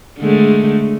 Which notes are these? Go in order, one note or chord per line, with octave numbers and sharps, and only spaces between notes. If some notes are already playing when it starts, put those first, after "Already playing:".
D3 G#3 A3